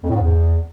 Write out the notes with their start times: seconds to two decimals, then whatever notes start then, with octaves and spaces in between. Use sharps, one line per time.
0.03 F2
0.09 A2
0.14 G#2
0.19 E2